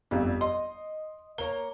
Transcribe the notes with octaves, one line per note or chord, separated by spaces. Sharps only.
G1 F2 G3
D#5 C6
A#3 C#5 A#5 G7